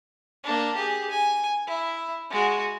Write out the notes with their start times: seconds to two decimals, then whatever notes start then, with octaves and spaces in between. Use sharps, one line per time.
0.43 A#3 D4
0.75 G4 G#4
1.10 G#5
1.67 E4
2.30 G#3 F#4